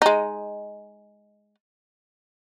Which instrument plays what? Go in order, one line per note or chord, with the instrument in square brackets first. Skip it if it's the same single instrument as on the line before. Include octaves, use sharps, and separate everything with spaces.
[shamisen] G#3 D#4